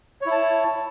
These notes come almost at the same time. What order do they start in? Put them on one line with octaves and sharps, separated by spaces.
C#5 E4 A5